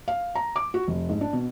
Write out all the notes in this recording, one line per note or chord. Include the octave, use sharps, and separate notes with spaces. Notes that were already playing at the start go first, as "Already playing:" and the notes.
F5
A#5
D6
F#4
F1
G#2
D4
B2